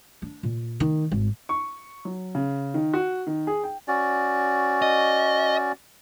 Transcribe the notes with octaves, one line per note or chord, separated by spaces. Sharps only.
D4
A#2
D#3
G#1
C#6
F#3
C#3
D#3
F#4
D#3
G#4
G5
C#4 F#4 D5
D#5